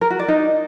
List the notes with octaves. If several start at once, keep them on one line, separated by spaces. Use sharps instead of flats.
A#4
F#4
D5
D#4